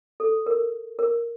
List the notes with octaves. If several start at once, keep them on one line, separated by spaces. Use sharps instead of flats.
A4
A#4
A#4